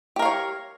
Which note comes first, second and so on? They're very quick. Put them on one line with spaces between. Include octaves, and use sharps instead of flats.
G4 A#4 F5 C#5